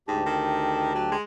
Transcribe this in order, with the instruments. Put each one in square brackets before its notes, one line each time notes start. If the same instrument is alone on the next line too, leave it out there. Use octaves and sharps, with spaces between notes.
[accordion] D2 G4 A5 [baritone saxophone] G#2
[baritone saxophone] D#3
F#3
G#3